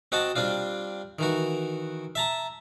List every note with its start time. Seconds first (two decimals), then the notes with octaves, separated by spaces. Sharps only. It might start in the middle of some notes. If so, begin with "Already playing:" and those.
0.12 C4 F#4 D#5 F#5 A5
0.36 G3 C4 D4 F4
1.19 D#3 E3 F#4
2.15 E5 A5 A#5